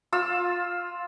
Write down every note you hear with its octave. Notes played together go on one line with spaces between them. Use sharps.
F4 E6